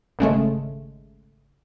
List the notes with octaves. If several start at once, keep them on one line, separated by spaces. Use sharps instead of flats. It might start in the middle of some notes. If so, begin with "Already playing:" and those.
G#1 C#3 G#3 A3